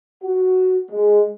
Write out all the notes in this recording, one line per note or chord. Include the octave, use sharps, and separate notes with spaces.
F#4
G#3